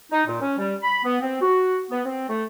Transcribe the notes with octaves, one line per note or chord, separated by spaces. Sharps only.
D#4
A#2
C#4
G3
B5
B3
C4
F#4
B3
C4
A3